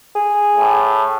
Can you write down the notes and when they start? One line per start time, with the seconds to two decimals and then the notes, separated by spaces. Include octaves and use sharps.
0.15 G#4
0.56 A2